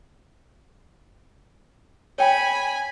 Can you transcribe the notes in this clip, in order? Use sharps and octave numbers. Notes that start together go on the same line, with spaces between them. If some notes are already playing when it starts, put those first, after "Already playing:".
C#5 G5 G#5 B5